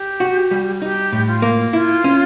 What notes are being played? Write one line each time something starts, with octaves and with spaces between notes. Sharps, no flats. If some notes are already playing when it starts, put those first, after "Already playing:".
Already playing: G4
F#4
G3
D#4 G4
A2
F4
A#3
E4 F4
C#4